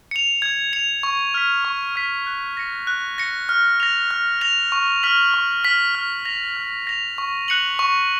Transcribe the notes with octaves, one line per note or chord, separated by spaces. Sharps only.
C#7 F7
G#6
C#7 F7
C#6
F6 B6
C#6
F6 B6
F#6
A#6 C#7
F#6
A#6 C#7
F6
A#6 F7
F6
A#6 F7
C#6
F6 B6 F#7
C#6
F6 B6 F#7
F6
A#6 F7
F6
A#6 F7
C#6
F#6 C#7 F#7
C#6